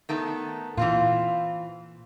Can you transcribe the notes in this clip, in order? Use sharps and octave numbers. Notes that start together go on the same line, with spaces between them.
D#3 A3 B3
A#2 E3 C4 F4